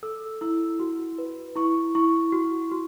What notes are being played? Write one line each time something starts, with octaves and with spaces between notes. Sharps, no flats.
A4 E6
E4 E6
F#4
B4
E4 C#6
E4 C#6
F#4
F#4